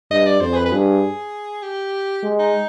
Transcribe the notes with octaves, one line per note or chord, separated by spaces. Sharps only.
G2 D#5
D5
F2 C5
G#4
B4
B4
G2 G#4
G4
G#3
D#4